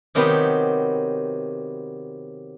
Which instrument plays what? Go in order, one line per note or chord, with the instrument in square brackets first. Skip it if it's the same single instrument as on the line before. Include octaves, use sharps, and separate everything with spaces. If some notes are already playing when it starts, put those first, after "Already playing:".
[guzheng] C3 D#3 F#3 B3 G4